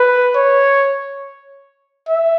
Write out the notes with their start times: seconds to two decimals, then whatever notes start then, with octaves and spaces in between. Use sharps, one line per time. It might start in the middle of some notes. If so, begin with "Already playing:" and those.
Already playing: B4
0.36 C#5
2.08 E5